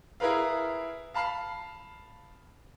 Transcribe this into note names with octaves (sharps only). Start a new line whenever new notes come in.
E4 G#4 A#4 B4 F5
F5 A5 B5 F6 C7